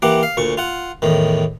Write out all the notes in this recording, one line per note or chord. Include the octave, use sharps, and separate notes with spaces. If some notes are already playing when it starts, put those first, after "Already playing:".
E3 A#3 G4 F#5 D6
F5
D2 A#2 C#6
F4 F#5
E2 A2 D#3